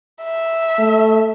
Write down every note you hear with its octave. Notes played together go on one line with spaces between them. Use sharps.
E5
A3